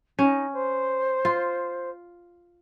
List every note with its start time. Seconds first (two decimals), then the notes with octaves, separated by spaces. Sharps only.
0.19 C#4 D#4
0.53 C5
1.25 F4